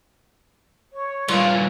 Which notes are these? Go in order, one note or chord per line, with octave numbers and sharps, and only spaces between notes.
C#5
G2 A#2 F4